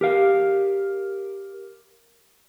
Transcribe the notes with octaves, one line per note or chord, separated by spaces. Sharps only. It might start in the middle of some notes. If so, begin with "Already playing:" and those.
G4 A#4 F5